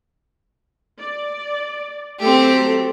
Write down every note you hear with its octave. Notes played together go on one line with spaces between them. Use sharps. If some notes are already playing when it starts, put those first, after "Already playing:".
D5
F#3 A3 C4 G4 A4